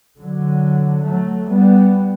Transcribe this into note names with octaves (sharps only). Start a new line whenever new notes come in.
D3 F#3
F#3 A3
G3 B3